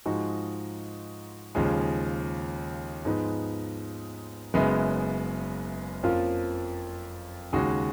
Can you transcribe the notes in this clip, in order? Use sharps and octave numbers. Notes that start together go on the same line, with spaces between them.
G#2 F3 G#3 D#4 F#4
D#2 C#3 F3 G#3
G#2 F3 G#3 B3 D#4
F#1 F#2 C#3 G#3 B3
F2 F3 A#3 C#4 F4
D#2 C#3 G#3 D#4 F#4